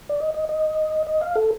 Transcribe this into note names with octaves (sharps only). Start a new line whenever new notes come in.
D5
D#5
D#5
D#5
D#5
F5
A4